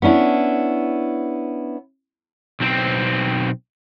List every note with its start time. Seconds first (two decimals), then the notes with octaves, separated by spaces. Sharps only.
0.02 B3 C#4 D4 E4
2.60 B1 C4